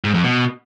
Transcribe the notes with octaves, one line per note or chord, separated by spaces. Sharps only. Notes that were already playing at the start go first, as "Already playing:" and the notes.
G#2
F2
B2